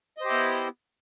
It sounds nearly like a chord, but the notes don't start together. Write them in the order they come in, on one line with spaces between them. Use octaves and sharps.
D#5 C5 G4 E4 B3